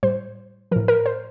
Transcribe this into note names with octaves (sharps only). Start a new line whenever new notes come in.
A2 G3 C5
A2 F3 A#4
A#4
C5